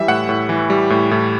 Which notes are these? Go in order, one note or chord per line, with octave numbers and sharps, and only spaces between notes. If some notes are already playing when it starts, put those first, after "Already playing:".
Already playing: E3 G3 E5
A2 F#5
A2
E3
G3
A2
A2